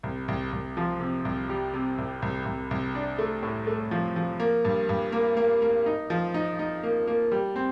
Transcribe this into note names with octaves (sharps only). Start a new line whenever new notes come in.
C2
C2
C2
F3
C3
C2
G3
C3
C2
C2
C2
C2
D4
A3
A2
A3
F3
F3
A#3
G2
G2
A#3
A#3
A#3
D#4
F3
D#4
D#4
A#3
A#3
G3
C4